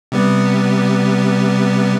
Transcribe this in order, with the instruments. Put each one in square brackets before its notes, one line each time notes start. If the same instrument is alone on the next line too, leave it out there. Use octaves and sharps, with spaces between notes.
[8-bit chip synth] C3 G3 B3